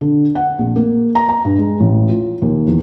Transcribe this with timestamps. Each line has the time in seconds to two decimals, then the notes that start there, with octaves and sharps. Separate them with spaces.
0.01 D3
0.35 F#5
0.59 A#1
0.76 A#3
1.15 A#5
1.29 A#5
1.45 G2
1.58 G#3
1.80 A1
2.09 F4
2.42 D#2
2.67 E2